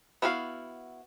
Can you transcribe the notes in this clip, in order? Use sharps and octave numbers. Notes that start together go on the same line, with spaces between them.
B3 E4 F#4 A#4 F5